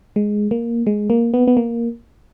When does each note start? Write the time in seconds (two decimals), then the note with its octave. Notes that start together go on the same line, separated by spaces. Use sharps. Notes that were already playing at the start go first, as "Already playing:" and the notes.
0.16 G#3
0.51 A#3
0.87 G#3
1.10 A#3
1.34 B3
1.48 B3
1.57 A#3